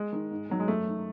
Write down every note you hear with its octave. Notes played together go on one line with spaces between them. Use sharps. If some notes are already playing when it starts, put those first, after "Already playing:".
Already playing: G#3
D#3
G#2
D#3 F#3
G#3
F#2 A3
D#3